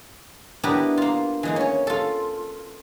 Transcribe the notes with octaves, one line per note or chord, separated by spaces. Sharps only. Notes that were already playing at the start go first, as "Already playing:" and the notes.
B3 D4 E4 G4 A#4 B4
A#3 F4
E3 G#3 A#3
C#4 C#5
F4 A4